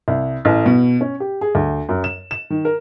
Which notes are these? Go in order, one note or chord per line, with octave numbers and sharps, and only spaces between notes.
C2
A1
B2
C#4
G4
G#4
D2
F#2
E7
E7
D#3
A#4